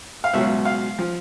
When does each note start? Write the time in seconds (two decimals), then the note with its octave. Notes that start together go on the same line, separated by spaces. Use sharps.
0.24 F5
0.33 C#2 B2 F#3 E5
0.65 F5
0.99 F3